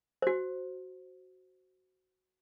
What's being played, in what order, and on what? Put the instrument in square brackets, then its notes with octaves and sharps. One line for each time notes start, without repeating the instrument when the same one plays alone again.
[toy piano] F#4 C5